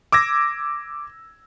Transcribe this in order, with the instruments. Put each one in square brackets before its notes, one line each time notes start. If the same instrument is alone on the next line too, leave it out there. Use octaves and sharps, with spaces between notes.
[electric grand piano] D6 E6 G#6 A#6